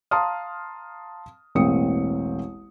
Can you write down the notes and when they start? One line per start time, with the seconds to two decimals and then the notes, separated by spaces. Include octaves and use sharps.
0.11 F5 A5 A#5 C6 D#6 F6
1.55 E1 A1 A#3 C4 D#6 C#7